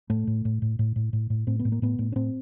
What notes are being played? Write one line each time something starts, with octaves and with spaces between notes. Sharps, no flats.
A2 A3
A2
A2
A2
A2
A2
A2
A2
A2 C4
B3
A2
A#3
A2 B3
A2
C#4
A2 C4